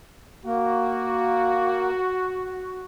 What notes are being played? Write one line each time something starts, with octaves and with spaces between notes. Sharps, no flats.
A#3 F#4